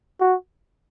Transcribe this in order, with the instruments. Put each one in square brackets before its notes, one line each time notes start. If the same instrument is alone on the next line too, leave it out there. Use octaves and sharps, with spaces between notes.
[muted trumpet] F#4